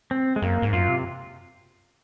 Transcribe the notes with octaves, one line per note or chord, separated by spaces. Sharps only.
C4
G#3
F#2 A#3
G#2
F#2 F4
C3